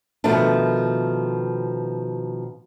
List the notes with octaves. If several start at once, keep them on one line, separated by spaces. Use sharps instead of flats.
B2 D#3 F3 A3 B3 D4